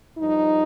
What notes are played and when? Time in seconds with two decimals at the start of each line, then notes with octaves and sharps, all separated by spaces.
0.18 G2 F3 D#4